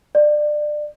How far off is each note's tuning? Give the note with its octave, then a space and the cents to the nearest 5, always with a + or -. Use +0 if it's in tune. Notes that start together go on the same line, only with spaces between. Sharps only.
D5 +25